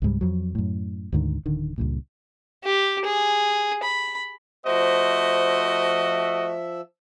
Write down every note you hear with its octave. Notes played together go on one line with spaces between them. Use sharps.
C#2 G#2 G3
F2 F#3
F#2 A2
D2 G#2 D3 D#3
D1 D3 D#3
C#2 G2 A#2
G4
G#4
B5
F3 A3 F#4 C5 D#5 E5